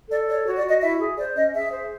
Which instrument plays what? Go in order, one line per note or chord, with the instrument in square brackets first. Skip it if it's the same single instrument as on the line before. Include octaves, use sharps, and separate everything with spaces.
[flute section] A4 D5
C#5 D5
F#4 C#5
D5
F#4
D#5
E4 E5
G#4
C5 D5
C#4 D#5
G#4 E5
C5